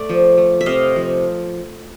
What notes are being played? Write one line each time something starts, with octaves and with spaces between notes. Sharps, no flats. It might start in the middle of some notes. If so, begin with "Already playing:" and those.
Already playing: A3 D5
F3
A3
E5
C3 D#5 F5
F3